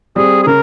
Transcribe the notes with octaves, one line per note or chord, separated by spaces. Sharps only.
G3 C4 G#4
G#4
C#3 A#4